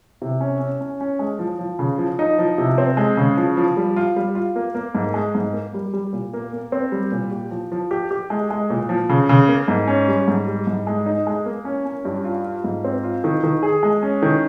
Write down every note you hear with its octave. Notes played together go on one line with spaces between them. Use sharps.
C3
C#4
C#4
C#4
C#4
G#3
F3
F3
C#3
F3
D#4
F3
C3
C4
G#3
C#3
F3
F3
G3
F4
G3
F4
A#3
A#3
G#2
G#3
G#2
A#3
G3
G3
A#2
A#3
A#3
C4
G3
A#2
G4
F3
F3
G4
G4
G#3
G#3
A#2
F3
C#3
C#3
A#3
G#2
C#4
G3
G#2
G3
G#2
G#3
D#4
G#3
A#3
C#4
C#4
G2
F4
F4
G#2
C4
F4
D#3
D#3
G#4
G#3
C#4
D#3